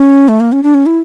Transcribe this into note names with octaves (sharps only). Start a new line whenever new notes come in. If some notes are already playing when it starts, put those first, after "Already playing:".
Already playing: C#4
A3
A#3
C#4
D4
C#4
E4